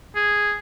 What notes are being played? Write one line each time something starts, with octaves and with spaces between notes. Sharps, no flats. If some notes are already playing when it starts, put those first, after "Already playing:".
G#4